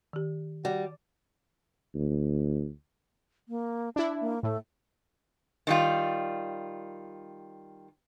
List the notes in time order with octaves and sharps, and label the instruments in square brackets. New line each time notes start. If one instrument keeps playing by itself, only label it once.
[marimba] D#3 G4
[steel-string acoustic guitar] G3 [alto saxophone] F#4
[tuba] D2
[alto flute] A#3
[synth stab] D4 E4 [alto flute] A5
[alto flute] A#3
[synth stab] A2 [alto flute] A3
[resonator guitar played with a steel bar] D#3 G3 F4